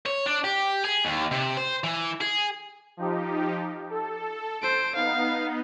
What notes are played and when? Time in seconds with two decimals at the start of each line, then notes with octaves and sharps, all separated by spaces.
0.06 C#5
0.26 D4
0.44 G4
0.85 G#4
1.05 D#2
1.32 C3
1.57 C5
1.84 E3
2.21 G#4
2.97 F3 D#4 G4
3.90 A4
4.62 C5 D7
4.95 B3 D#4 F5